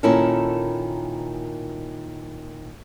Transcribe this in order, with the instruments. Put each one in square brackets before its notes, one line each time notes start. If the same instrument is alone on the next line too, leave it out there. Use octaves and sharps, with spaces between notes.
[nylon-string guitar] A#2 D#3 C#4 E4 A4 A#4